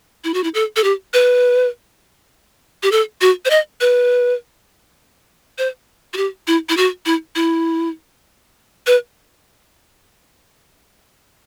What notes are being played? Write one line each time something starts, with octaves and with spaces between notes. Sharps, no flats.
E4
F#4
E4
A4
A4
G4
B4
G4
A4
F#4
C5
D#5
B4
C5
F#4
G4
E4
E4
F#4
E4
E4
B4